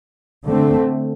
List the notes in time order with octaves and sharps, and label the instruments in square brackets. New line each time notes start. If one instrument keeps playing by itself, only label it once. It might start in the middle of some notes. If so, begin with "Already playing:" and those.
[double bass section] D3 A3 C4